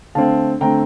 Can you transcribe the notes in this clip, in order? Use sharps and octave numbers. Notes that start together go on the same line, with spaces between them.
D3 A3 C4 F5 A5
D3 A3 C4 G5 A#5